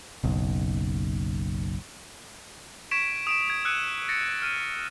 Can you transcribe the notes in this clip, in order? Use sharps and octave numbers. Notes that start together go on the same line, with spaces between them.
F#1 B1
C#6 G#6 B6 D7 E7
D#6 D7 E7
G#6
D#6 E6 F#6 C#7 D#7
A6 A#6 C#7
F6 D#7